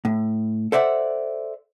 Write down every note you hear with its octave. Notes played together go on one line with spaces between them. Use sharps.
A2
A4 C5 D5 E5 F#5